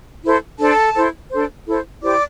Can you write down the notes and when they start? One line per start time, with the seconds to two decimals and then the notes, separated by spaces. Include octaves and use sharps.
0.24 E4 A4 C5
0.59 D4 A4 C5 A5
0.95 E4 A4 C5
1.31 D4 A4 C5
1.66 E4 A4 C5
2.01 E4 G4 C5 D5 D6